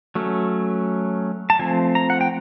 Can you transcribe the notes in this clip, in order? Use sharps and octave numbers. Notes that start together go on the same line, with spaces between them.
F#3 A3 C#4
A5
F3 A3 C4 G#5
A#5
F#5
G5